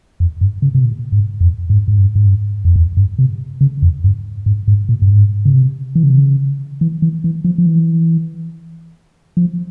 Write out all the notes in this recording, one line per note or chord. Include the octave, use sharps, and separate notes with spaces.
F2
G2
C#3
C3
A#2
G#2
F2
G#2
G#2
G2
G#2
G2
F2
E2
G2
C3
C#3
F2
G2
G#2
G#2
A#2
G2
G#2
C#3
C3
E3
C#3
C3
C#3
E3
E3
E3
F3
F3
E3
F3